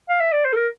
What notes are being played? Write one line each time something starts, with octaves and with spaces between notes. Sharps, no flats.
F5
E5
D5
C5
A4
A#4